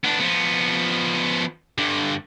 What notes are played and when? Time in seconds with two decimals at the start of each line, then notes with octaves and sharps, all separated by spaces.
0.04 B3 D4
0.20 F3 B3
1.78 G2 D3